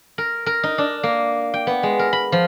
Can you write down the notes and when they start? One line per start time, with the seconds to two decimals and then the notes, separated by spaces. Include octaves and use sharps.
0.18 A#4
0.46 A#4
0.63 D#4
0.78 D4
1.03 A#3
1.54 G5
1.67 B3
1.83 G#3
1.99 A#4
2.13 B5
2.32 F3